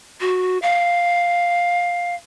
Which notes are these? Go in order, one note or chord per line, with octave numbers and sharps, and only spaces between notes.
F#4
F5